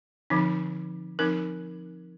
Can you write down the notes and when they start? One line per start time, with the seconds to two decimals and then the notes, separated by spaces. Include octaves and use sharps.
0.30 D3 F3 C4 D#4
1.19 F3 C4 D#4 A#4